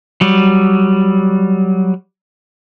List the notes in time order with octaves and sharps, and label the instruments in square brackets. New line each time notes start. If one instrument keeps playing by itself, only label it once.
[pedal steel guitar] F#3 G3